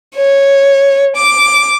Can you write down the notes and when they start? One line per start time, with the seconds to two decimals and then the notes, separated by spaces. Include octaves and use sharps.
0.17 C#5
1.16 D6